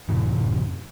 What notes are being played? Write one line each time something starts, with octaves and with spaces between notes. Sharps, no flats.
F#2 A2 C3 E3